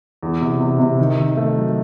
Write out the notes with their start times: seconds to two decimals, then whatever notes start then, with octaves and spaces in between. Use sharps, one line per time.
0.23 E2
0.41 C3
0.60 C3
0.79 C3
0.99 D#3
1.18 D#3
1.37 A3
1.56 F#3